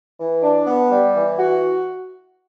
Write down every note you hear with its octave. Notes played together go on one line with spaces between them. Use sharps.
E3
D4
B3
G3
E3
F#4